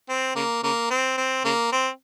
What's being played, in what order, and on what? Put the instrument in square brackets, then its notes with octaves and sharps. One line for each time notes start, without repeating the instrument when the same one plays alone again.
[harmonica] C4
C#3 A#3
C#3 A#3
C4
C4
C#3 A#3
C4